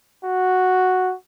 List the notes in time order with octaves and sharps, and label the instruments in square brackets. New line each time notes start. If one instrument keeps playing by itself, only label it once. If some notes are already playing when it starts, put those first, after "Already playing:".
[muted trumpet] F#4